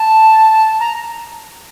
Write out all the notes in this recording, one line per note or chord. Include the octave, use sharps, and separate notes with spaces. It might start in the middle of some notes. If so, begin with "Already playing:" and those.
Already playing: A5
A#5